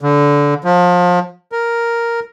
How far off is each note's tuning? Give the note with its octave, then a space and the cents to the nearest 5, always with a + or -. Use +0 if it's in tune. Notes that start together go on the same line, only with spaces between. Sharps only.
D3 -20
F3 +30
A#4 +0